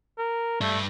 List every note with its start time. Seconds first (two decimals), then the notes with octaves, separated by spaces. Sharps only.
0.18 A#4
0.61 G2 A3 D4